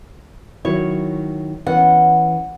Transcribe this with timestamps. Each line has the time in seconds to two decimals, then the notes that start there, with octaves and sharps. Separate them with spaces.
0.65 D#3 F#3 E4 C#5
1.66 E3 B3 C#4 F#5